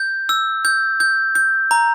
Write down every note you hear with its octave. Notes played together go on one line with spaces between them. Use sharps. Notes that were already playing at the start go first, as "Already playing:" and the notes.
Already playing: G6
E6
G6
G6
G6
A#5